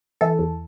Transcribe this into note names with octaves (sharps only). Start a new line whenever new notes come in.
E3 A4
E2